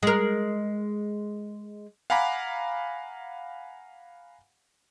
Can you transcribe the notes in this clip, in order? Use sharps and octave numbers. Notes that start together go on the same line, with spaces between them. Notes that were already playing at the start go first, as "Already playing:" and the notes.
G#3 A#4
F5 F#5 G#5 A#5 B5 D6